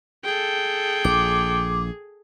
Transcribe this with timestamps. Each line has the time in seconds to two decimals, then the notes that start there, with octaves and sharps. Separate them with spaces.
0.24 G#4 A4 G5
1.05 A#1 D6